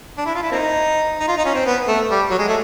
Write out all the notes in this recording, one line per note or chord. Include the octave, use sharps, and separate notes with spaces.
D4
E4
F4
E4
A#3 C4 D#4
D#4
F4
D#4
C#4
C4
B3
A3
G3
F#3
G#3
A3